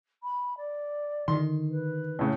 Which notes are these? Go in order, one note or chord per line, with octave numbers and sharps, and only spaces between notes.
B5
D5
D3 D#3 C6
B4
A2 C#3